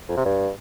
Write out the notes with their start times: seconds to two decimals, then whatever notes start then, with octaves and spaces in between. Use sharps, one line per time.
0.08 F2
0.17 C3
0.25 G2